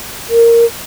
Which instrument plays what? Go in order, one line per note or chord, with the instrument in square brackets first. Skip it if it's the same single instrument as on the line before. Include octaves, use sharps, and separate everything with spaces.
[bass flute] A#4